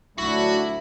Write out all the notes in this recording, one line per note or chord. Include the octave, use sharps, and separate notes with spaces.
D2 F#3 D4 E4 F#4